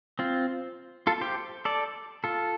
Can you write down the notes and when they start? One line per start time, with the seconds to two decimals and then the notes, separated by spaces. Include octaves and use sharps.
0.19 C4 F4
1.07 F4 A4
1.21 G4 C5
1.65 A4 D5
2.24 F4 A4